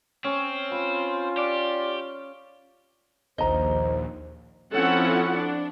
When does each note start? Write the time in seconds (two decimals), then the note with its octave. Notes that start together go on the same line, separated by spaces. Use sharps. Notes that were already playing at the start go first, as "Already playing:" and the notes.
0.25 C4 C#4
0.72 F4 B5
1.38 G4 D5
3.38 A#1 D#2 C5 D#5 A#5
4.72 F3 C4 C#4 E4 A4 F#5
5.36 D4